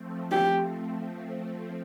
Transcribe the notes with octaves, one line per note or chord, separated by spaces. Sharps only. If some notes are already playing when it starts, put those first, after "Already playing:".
Already playing: F3 A3 C4
G4